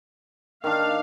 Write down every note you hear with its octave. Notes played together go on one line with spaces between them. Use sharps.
D#3 D4 F5